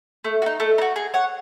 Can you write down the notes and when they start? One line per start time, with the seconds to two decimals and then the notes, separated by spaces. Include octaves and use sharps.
0.24 A3
0.42 F#4
0.46 D#4
0.60 A3
0.78 D#4
0.81 F#4
0.96 G#4
1.14 C#5 F#5